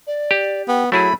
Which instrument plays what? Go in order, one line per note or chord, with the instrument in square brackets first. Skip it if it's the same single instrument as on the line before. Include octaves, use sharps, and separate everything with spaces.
[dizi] D5
[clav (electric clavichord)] G4
[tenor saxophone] B3 [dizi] G5
[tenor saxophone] F#3 [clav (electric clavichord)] A3 E4 G#4 [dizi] B5